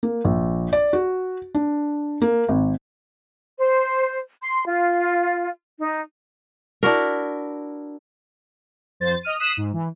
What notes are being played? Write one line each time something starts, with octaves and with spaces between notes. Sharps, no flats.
A#3
A#1
D5
F#4
D4
A#3
G#1
C5
C6
F4
D#4
D4 E4 F#4 A#4
F2 C5 A6
D#5 F6 D#7
D#6 F#6 B6 C7 D#7 E7
G#2
E3